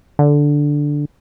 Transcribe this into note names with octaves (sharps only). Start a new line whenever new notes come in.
D3